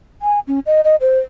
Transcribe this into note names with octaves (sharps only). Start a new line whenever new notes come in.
G#5
C#4
D#5
D#5
C5